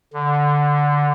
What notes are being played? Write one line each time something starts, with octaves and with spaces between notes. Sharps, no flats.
D3